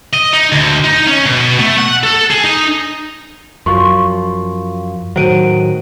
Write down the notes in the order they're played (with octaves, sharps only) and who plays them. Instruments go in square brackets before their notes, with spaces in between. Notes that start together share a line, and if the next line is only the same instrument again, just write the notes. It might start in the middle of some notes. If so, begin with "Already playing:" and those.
[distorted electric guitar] D#5
D#4
D2
D#4
C#4
B2
A3
F#5
A4
G#4
D#4
[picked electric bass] F#2 F3 [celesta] C6 C#6
[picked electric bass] A2 D#3 F#3 [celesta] C5 D7 D#7